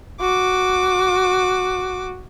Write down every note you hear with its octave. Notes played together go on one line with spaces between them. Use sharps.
F#4 D6